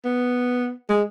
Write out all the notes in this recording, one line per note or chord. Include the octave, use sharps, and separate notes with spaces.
B3
G#3